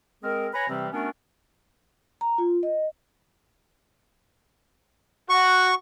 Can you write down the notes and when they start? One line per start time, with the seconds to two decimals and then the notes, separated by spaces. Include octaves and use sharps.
0.23 G#3 C4 G#4 A#4
0.53 B4 C#5 G#5 A#5 B5
0.68 C3 E3 G3 C4
0.92 A3 B3 C#4 D4 F#4 A#4
2.21 A#5
2.38 F4
2.63 D#5
5.30 F#4 C#6